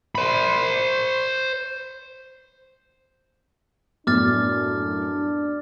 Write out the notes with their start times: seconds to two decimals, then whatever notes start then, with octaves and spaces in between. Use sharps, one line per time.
0.15 C5 B5
4.07 F#2 A2 B3 D4 D6 F6 A6